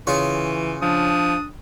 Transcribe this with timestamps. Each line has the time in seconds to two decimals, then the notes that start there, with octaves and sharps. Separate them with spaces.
0.07 C#3 E3 F4 C#6
0.82 F3 D4 D#6